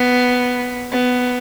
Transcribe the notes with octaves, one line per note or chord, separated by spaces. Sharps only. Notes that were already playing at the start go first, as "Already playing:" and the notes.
Already playing: B3
B3